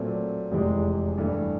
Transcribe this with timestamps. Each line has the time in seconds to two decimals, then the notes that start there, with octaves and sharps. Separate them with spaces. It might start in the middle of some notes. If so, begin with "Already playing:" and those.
Already playing: A#2 F#3 A3 C4
0.51 F1 E2 C3 E3 G#3
1.18 G2 E3 A3